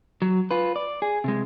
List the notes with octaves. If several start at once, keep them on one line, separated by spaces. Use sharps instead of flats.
F#3
F4 B4
D5
G#4
C3 G#3